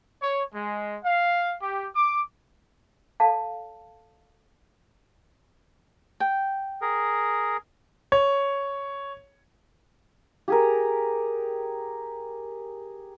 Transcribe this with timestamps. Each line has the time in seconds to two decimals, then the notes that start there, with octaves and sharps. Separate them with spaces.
0.22 C#5
0.55 G#3
1.04 F5
1.62 G4
1.95 D6
3.20 A4 D5 F5 A5
6.20 G5
6.81 G#4 A#4
8.12 C#5
10.48 G4 G#4 A#4